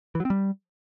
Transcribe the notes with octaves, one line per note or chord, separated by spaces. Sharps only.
E3
F#3
C4
G3